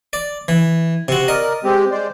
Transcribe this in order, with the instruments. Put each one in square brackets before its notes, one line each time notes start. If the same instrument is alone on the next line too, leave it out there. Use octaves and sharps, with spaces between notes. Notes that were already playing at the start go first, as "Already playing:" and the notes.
[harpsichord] D5
E3
[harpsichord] C3 F#4 [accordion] C4
[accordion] A#4 D5 [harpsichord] D#5
[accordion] G#3 C4 G4
G#3 C5 D5